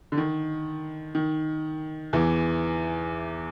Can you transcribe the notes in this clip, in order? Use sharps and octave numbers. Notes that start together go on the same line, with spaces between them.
D3
D#3
D#3
E2 E3